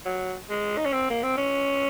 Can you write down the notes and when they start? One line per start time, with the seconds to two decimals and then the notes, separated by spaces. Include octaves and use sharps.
0.05 F#3
0.49 G#3
0.77 D#4
0.85 C#4
0.93 C4
1.10 A#3
1.23 C4
1.37 C#4